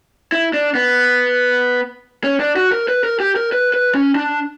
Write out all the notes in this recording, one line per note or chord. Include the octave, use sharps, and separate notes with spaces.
E4
D4
B3
C#4
D4
F#4
A#4
B4
A#4
G4
A#4
B4
B4
C#4
D4